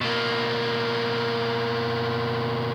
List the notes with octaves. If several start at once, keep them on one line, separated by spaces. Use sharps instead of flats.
B2 A#3